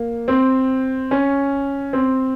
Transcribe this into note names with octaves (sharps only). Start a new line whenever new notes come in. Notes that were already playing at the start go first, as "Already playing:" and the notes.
Already playing: A#3
C4
C#4
C4